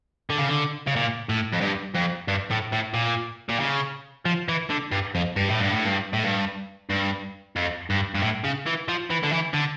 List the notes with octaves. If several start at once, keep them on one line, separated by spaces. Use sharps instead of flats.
D3
C#3
D3
C#3
A#2
A2
F2
G2
F2
G2
A2
A2
A#2
A#2
C#3
F3
E3
D3
G2
F2
G2
A2
G2
A2
G2
A2
G2
G2
F2
G2
G2
A2
C#3
E3
F3
E3
D3
E3
D3